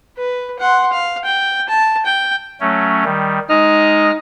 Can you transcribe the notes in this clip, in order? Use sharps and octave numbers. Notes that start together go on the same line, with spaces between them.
B4
F#5 C6
F5
G5
A5
G5
F#3 A3 C#4
D#3 G3
G#3 D#4 F6